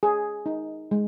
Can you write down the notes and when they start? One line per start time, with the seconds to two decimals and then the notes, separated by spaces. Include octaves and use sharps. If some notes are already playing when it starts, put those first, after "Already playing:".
0.03 G#4
0.46 D#4
0.91 G#3